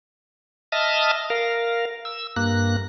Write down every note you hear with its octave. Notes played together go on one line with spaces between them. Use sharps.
D#5 E5 A5 D#6 F6
A#4 F5
E6
G2 A#3 F#6